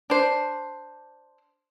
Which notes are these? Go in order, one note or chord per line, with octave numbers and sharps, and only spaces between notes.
D4 C5